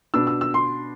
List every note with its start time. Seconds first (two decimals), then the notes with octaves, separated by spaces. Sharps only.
0.14 B2 B3 D4 E6
0.27 E6
0.41 E6
0.54 C6